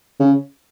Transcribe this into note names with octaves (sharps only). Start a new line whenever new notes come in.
C#3